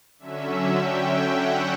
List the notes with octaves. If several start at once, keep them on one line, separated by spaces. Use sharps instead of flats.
D3 F#3 C#4 E5
G5
F#5